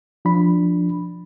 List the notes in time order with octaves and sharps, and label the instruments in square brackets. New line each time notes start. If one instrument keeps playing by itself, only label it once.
[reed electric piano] F3 D4 B5